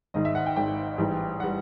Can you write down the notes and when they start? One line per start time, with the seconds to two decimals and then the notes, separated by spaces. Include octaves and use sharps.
0.14 G#1 G#2 D#3 D#5
0.25 E5
0.35 F#5
0.46 G5
0.56 G#1 G#2 D#3 G5
0.98 A1 G#2 E3 G3
1.40 E3 G3 F#5